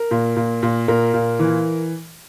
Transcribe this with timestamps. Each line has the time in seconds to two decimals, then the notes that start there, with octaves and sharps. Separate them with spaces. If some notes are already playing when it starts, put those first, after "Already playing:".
Already playing: A#4
0.11 A#2
0.36 A#2
0.63 A#2
0.88 A#2 A#4
1.14 A#2
1.39 E3